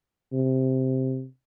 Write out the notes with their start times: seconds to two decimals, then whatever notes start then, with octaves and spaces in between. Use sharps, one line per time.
0.33 C3